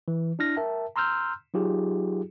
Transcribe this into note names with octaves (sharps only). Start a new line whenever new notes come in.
E3
D4 E4 F6 A#6
A#4 E5 G5 A5
A#5 C6 E6 F6 G6
F#3 D#4 F4 G4 G#4